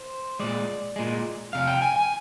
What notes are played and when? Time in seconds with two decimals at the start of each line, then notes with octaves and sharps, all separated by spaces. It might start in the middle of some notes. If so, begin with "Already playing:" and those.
Already playing: C5
0.40 A#2 G#3 D5
0.96 A#2 G#3
1.53 F2 C3 F5
1.67 G5
1.82 G#5
1.96 G#5